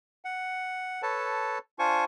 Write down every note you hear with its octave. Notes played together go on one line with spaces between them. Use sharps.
F#5
A4 B4 C#5 A5
D4 F4 C5 G#5 C#6